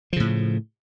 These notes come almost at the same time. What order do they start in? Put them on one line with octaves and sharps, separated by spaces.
F3 C#3 A2